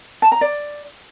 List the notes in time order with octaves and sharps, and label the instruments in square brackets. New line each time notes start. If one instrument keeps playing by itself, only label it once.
[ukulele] A5
A#5
D5